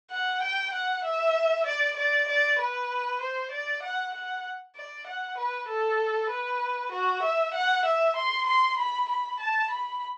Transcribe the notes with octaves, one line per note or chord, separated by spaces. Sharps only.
F#5
G5
F#5
E5
D5
D5
D5
B4
C5
D5
F#5
F#5
D5
F#5
B4
A4
B4
F#4
E5
F#5
E5
C6
C6
B5
B5
A5
B5